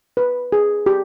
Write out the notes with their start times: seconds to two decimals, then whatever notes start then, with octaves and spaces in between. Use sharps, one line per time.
0.17 B4
0.52 G#4
0.86 G4